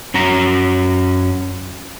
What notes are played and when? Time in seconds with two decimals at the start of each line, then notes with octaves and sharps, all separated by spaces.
0.14 F#2 C#4 F#4 A#5